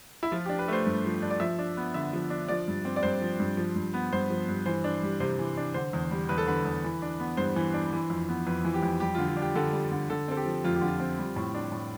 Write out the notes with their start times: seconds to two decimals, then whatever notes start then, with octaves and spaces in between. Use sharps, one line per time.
0.23 E4
0.32 F3 F4
0.46 D4 G4
0.59 B4
0.68 A3 C5
0.86 G2
1.05 F3
1.22 D4
1.30 D5
1.40 F3 E5
1.59 D4
1.77 B3
1.94 D3 E5
2.13 F3
2.30 D4
2.49 F3 D5
2.68 G2
2.85 C4
2.96 D5
3.03 G2 C5
3.22 F3
3.40 G2
3.57 F3
3.76 G2
3.94 B3
4.13 G2 C5
4.30 F3
4.48 G2
4.66 E3 C5
4.84 D4
5.03 G3
5.20 C3 C5
5.39 E3
5.57 D4
5.74 D3 C5
5.93 E2
6.11 G3
6.29 E2 B4
6.38 A4
6.47 D3 B4
6.65 E2
6.84 E3
7.02 D4
7.20 B3
7.37 G2 C5
7.56 E3
7.74 D4
7.93 E3
8.10 F2
8.29 B3
8.47 F2 B4
8.65 E3
8.74 G4
8.83 F2
9.00 G3 G4
9.15 D3 F4
9.28 F4
9.36 D4
9.42 G4
9.55 D3 A4
9.73 G3
9.91 D3
10.10 D3 A4
10.28 C4 A4
10.37 G4
10.45 F3
10.64 F2 F4
10.75 G4
10.81 D3
10.88 F4
11.00 C4
11.18 G3
11.36 A2
11.54 D4
11.72 A2